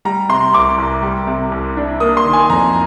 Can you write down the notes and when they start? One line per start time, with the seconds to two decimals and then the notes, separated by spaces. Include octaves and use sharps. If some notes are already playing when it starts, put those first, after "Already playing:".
0.05 G3 A#5
0.29 C3 C6
0.54 C2 D6
0.78 C2
1.02 G3
1.27 C3
1.52 C2
1.77 D4
2.00 A#3 D#6
2.17 C6
2.25 D#3
2.33 G#5
2.50 F2 A#5